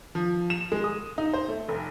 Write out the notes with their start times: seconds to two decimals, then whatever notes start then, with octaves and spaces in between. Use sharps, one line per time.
0.15 F3
0.50 E7
0.72 G#3
0.84 D#6
1.18 D#4
1.33 C5
1.48 A3
1.68 F1